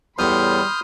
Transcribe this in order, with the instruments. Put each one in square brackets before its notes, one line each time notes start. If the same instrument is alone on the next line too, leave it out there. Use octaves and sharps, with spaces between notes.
[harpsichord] E2 A2 [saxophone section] G3 [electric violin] B5 C6 [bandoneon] D#6 F6 G6